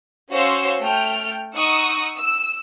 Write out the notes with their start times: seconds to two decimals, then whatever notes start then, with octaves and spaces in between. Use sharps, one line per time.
0.32 C#4 F#4 C5 F5 C6 E6
0.81 A3 G5 F6
1.56 D#4 F#5 C#6 D#6 E6
2.17 E6